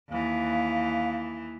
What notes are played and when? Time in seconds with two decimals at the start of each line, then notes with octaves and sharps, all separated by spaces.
0.10 D#2 E3 F5